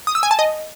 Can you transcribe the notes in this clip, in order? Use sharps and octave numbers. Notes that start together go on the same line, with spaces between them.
D#6
E6
G#5
A5
D#5